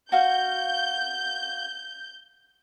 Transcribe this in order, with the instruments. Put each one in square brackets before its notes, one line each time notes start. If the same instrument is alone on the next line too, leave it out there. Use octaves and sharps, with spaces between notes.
[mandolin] F#4 F5 [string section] G6